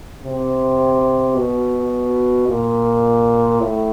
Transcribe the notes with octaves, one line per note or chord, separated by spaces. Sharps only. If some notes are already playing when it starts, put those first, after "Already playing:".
C3
B2
A#2
A2